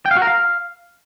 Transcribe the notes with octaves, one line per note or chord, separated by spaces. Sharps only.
G5
F5
F#4
A#4
F5